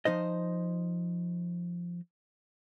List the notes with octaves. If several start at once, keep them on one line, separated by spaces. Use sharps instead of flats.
F3 D#4 C5 D#5